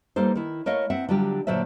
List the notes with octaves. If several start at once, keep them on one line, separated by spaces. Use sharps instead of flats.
G3 A#3 D#4 A4 C5
D#3 E4
A3 A#4 C#5 D#5 F5
C4 E5 F#5
D3 F#3 G3 F4 G4
A#2 D3 F#3 D4 C5 E5